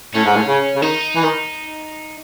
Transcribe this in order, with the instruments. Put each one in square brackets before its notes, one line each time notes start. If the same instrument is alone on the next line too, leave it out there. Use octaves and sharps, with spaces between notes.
[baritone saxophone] A2 [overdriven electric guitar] C#4
[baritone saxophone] G#2
A2
C#3
C#3
[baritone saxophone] D#3 [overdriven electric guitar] D#4
[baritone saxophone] E3
D#3